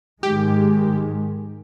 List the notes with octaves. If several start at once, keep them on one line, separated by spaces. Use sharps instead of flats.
G#2 D#3 G#3 G4